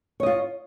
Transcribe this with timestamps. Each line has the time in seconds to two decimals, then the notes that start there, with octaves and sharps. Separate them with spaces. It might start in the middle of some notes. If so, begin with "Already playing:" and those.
0.20 C#5
0.23 D#5
0.26 F4